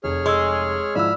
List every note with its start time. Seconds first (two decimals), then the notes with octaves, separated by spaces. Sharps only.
0.04 F1 G#4 C#5 F6
0.26 G#3 C6 E6
0.95 G#2 F3 E4 D5 B5 E6 F6